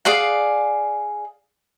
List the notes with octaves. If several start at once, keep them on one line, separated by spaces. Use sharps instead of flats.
G#4 D5 F5 F#5